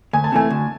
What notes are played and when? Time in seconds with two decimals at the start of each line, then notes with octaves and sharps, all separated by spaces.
0.13 D2 G#5
0.24 A5
0.32 C3 E3 A3 G#5
0.50 D2